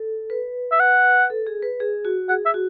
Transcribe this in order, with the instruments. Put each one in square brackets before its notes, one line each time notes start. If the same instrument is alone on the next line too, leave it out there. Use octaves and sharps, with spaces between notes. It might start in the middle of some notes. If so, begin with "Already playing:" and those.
Already playing: [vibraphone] A4
B4
[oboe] E5
F#5
[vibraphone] A4
G#4
B4
G#4
F#4
[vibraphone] G#4 [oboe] F#5
[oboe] E5
[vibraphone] F#4